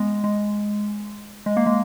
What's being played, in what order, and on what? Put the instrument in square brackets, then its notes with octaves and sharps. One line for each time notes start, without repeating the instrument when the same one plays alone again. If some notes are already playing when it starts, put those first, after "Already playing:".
Already playing: [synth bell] G#3 B3
G#3
G#3
A#3
G#3